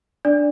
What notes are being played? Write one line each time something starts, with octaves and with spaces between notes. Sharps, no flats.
D4 D5